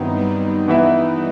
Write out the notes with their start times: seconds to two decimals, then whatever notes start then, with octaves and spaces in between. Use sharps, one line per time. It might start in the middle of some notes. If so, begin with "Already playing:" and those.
Already playing: G2 D#3 F#3 B3 C4 D#4 E4
0.15 G3 B3
0.68 E3 B3 E4 B4 E5